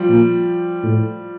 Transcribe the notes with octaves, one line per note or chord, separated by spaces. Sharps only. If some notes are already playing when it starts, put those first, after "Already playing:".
Already playing: F3 G3
A#2
A2